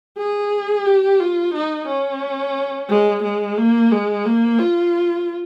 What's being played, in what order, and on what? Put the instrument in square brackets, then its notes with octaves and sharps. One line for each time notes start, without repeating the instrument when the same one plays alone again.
[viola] G#4
G4
F4
D#4
C#4
G#3
G#3
A#3
G#3
A#3
F4